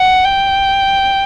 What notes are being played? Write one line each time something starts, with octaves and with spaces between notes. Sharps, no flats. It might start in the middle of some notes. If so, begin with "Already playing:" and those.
Already playing: F#5
G5